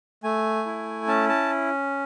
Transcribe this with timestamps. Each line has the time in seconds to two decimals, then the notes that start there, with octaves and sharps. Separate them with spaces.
0.24 A3 G#5
0.66 E4
1.07 C#4 A5
1.29 A5